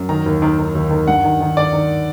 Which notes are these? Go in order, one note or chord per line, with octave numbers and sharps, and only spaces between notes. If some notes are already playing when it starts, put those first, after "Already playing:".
Already playing: F#2
D#3 A#5
D#2
D#3
D#3
D#2
D#3
G2 F#5
D#3
D#3
D#3 D5
D#3